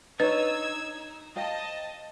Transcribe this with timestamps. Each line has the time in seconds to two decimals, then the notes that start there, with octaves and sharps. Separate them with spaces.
0.20 D4 D#4 B4 C#5 E6 G#6
1.36 C5 D#5 F5 G5 A5